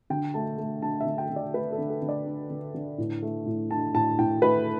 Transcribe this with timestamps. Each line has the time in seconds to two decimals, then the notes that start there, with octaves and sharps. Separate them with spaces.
0.10 D3 G5
0.34 A3 A5
0.58 A3
0.82 D3 A5
1.00 E5
1.06 D3
1.18 G5
1.30 D3
1.36 D5
1.54 A3 B4
1.72 A4
1.78 D3
1.90 A4
2.02 D3
2.09 D5
2.26 D4
2.50 D3
2.75 D3
2.98 A2
3.22 A3
3.46 A2
3.71 D4 A5
3.94 A2 A5
4.19 A2 G5
4.42 A3 B4